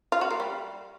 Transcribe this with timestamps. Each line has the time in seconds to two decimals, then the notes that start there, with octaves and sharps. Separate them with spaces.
0.12 F4
0.21 F#4
0.31 A#3
0.40 G3